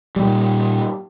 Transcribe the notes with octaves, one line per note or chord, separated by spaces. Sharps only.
A#2 G3